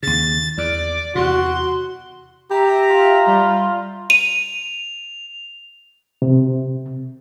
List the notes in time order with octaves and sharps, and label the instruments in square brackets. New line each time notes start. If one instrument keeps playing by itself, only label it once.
[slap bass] D#2 C#3 [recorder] A6
[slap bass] E2 [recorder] D5
[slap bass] E2 C3 [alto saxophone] F#4 [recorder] C6
[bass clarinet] G4 [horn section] E5 A#5
[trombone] F4
[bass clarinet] G3
[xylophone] D#7 [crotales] F7
[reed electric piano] C3